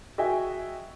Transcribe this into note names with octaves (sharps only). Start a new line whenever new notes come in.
F#4 G#4 D#5 E5 G5 G#5